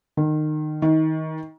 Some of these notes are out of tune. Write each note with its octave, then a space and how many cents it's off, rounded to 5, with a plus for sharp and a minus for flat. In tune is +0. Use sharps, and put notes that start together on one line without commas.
D#3 -25
D#3 +25